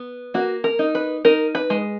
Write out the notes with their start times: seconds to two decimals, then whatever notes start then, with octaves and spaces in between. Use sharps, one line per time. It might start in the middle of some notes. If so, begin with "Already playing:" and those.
Already playing: B3
0.34 A#3 F#4
0.64 A#4
0.79 D#4
0.95 B4
1.25 D#4 A#4
1.55 B4
1.70 G#3